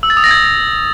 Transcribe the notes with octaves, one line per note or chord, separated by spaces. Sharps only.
E6
A6
D#6
A#6
G#6